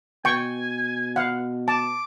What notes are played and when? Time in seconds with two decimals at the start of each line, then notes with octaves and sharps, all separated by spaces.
0.25 B2 G5 G#5 C#6
1.16 F5 F#5
1.68 A5 D6